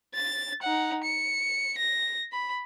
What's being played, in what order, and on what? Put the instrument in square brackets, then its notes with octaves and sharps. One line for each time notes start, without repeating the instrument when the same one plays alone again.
[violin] A6
D#4 F#5
C#7
A#6
B5